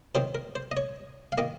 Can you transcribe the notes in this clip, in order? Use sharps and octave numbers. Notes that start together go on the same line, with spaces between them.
D#3 F#3 C4 D#4 C5
A#4
C5
D#5
C#5
F5
D#3 A#3 D#5